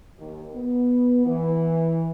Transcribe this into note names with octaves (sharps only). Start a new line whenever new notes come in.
D#2
B3
E3